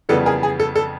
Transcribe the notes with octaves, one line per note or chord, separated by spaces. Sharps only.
F2 C#3 E3 G3 B3 A4
G#4 A#4
G#4
A4
A4